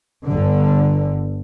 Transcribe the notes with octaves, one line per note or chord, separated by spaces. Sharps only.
G1 D3